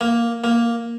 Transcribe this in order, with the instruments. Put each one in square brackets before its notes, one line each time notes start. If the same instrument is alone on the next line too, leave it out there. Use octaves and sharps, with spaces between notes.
[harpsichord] A#3
A#3